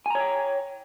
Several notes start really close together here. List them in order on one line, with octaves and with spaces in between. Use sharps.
G#5 A#5 C#5 G5